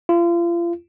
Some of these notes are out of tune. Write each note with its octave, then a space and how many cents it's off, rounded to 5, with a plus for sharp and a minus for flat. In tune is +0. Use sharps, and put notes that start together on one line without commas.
F4 -35